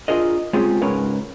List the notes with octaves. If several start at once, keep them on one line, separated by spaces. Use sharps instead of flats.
D4 F4 G#4 A#4 D#5
G#3 C4 C#4 F4 G4 G#4
C#2 G#2 C#4 A#4 B4 C#5